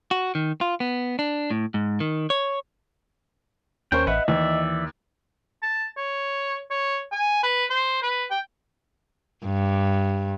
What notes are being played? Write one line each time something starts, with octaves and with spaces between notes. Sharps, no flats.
F#4
D#3
F4
B3
D4
A2
G#2
D#3
C#5
D#2 C#4 A#4 C5 G5 C#6
A1 B4 D#5 E5 F#5
D#2 E3 D5 E5
A5
C#5
C#5
G#5
B4
C5
B4
G5
G2